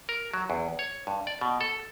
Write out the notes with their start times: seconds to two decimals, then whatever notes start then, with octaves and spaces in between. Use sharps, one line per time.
0.09 A#4
0.34 F#3
0.50 E2
0.79 C#5
1.07 G2
1.27 D5
1.41 B2
1.61 A4